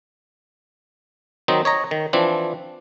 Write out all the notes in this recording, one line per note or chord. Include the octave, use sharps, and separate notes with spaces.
D#3 F#3 C4 D#4
C#5 D#5 A#5
D#3
E3 F3 C4 D4